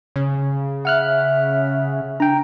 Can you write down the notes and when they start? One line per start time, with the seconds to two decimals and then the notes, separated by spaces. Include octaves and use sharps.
0.16 C#3
0.85 E5 F#5 F6 F#6
2.20 D4 G5 A#5